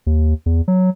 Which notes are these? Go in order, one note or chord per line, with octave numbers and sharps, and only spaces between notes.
D#2
E2
F#3